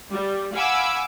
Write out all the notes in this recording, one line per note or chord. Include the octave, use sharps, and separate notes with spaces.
G3
F5 F#5 G#5 B5 D6 E6